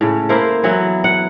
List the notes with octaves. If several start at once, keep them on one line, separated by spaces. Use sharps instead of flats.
A2 C#3
A#3 E4 A#4 C5
E3 F#3 B3 E4
F#5